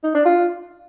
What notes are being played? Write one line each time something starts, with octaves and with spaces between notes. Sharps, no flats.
D#4
D4
F4